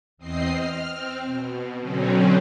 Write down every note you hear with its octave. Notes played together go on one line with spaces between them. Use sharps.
E2 C4 D#5 C7
F6
C4
B2
B2 D3 F#3 C4 C#4